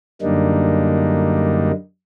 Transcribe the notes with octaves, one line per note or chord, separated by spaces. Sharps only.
F#2 D3 G3 A#3 D4 D#4